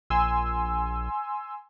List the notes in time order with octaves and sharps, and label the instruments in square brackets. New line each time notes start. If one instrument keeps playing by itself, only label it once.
[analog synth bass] A#1 [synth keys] G#5 C6 E6